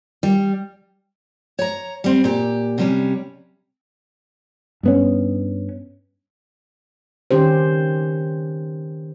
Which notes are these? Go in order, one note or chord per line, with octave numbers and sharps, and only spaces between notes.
G3
C#5 A#5
G3 C4
A#2 G4
C3 G3 C#4
G2 B3 C#4
D#3 C#4 G4 C5